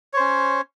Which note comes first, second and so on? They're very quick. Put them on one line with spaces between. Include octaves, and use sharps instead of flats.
C#5 C5 C#4